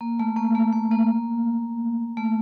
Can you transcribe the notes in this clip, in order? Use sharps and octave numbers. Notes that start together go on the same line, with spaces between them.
A#3
A3
A#3
A3
A3
A#3
A3